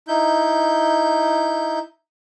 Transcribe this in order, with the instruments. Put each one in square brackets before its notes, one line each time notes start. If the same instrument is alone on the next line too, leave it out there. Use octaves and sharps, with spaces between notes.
[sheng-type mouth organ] D#4 E4 G6